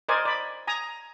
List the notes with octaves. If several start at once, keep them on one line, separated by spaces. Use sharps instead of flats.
A#4 C5 D5 D#5 G#5
D5 B5
G#5 A#5 D#6